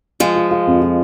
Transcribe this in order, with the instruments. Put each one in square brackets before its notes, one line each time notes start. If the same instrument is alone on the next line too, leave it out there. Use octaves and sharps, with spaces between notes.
[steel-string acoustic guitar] F3 G#3 [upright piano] F4
[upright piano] F4
F4
F2
F4